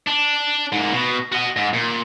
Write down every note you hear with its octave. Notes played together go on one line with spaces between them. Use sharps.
D4
G#2 A#3
B2
F#4 D#5
G#2
A#2